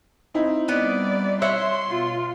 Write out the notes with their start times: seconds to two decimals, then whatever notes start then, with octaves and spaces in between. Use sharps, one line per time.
0.34 C4 D#4 E4
0.68 G3 B3 D5 D#5
1.42 C#5 E5 F#5 C6
1.88 B2 F4